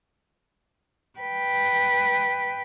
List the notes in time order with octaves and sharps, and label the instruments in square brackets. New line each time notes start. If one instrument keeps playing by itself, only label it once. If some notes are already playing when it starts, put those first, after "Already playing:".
[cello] B4 G5